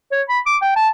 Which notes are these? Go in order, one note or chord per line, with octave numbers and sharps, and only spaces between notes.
C#5
B5
D6
G5
A5